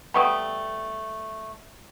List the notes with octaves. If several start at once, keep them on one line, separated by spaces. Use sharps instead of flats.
G3 A3 B3 B5 C#6 D#6